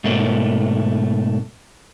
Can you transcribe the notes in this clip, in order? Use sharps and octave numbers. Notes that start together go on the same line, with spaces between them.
G#2 B2 A3 A#3